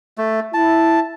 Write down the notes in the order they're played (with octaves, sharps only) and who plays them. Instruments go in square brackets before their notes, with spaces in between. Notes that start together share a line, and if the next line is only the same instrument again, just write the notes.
[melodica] A3
[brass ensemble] E4 [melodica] A5